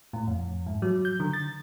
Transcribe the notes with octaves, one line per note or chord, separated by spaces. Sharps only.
A2
F2
G#2
F#3
G6
D3
A6